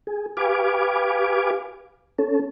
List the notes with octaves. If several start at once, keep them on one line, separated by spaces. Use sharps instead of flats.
G#4
G4 B4 F5 G#5 D6
C#4 A4